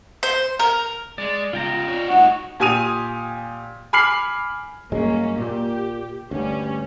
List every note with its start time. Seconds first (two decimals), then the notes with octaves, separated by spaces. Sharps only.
0.23 C5
0.59 A#4
1.18 G#3 D5
1.53 C#3 B3 F4 G5 A#5
1.88 D4 C#5
2.09 A2 D#4 F#4 F#5
2.60 A#2 G4 G#5 D#6 D#7 F7
3.93 G#5 B5 D6 F6 C7 F#7
4.92 G2 F#3 G#3 A#3 C#4
5.38 A#2 G4
6.31 D2 G2 G3 C#4